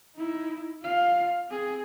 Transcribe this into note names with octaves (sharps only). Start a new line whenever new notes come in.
D#4 E4
F4 F5
C4 G#4